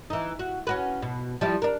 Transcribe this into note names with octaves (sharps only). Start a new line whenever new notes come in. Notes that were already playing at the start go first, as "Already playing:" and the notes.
E3 D#4
F#4
C#4 F#4 B4
B2
F3 G3 E4
D4 A#4